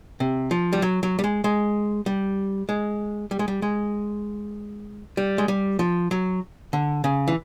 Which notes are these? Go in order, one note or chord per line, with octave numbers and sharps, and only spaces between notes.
C3
F3
G3
F#3
F#3
G3
G#3
G#3
G3
G#3
G3
G#3
G3
G#3
G3
G#3
G3
F3
F#3
D3
C#3
E3